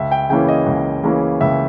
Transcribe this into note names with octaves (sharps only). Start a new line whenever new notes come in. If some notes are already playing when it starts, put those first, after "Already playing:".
Already playing: C#2 E5
G5
C#3 E3 A#3 C#4 G5
D#5
C#2
C#3 E3 A#3 C#4
C#2 E5